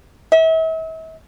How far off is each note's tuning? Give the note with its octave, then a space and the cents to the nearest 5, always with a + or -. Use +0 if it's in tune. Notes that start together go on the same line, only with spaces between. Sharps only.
E5 -40